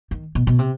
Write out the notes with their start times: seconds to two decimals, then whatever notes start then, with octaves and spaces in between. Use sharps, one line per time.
0.11 D#3
0.35 B2
0.47 B2
0.59 C3